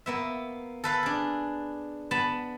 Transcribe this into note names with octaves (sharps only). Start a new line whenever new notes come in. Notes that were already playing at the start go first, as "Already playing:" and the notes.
A#3 B3 E5
A4 B4 F5
D4 G#4
B3 A5 B5